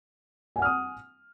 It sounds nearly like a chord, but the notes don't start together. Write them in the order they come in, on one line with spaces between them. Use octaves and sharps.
G#5 F#5 F6 D#6